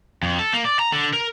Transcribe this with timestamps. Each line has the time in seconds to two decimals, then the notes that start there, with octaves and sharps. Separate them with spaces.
0.23 F2
0.39 A4
0.53 A#3
0.65 D5
0.79 A#5
0.92 D3
1.13 A#4